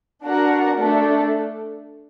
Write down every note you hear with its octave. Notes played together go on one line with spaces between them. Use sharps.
D4 F#4 A#4 F#5
A3 D4 A4